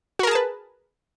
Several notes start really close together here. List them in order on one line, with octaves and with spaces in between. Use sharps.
F#4 A#4 G#4 A5 B4